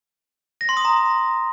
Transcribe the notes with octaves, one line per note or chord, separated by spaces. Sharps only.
A#6
C6
D#6
A#5